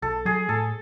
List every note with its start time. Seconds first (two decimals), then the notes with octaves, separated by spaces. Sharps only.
0.02 B1 A4
0.25 F#3 G#4
0.49 A2 A4